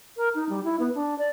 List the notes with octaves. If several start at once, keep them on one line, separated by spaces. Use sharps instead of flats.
A#4
D#4
G3
E4
B3
D4
D5